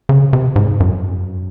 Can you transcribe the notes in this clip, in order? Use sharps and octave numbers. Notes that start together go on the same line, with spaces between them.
C#3
C3
G#2
F#2